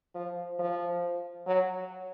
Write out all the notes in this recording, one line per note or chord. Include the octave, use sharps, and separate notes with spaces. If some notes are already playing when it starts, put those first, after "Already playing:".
F3
F3
F#3